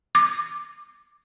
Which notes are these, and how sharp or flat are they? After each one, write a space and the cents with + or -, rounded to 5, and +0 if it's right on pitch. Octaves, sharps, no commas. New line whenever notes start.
D6 +5